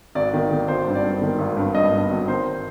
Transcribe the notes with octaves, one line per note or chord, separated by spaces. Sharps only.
G#1 D5
D#3
D#3
G#1 C5
G2
D5
G2
D#3
G#1
G2
G2 D#5
G2
G#1
D#3 C5